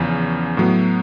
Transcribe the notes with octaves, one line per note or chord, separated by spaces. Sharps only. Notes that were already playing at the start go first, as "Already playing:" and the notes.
Already playing: E2 C#3 F3
A2 F#3 B3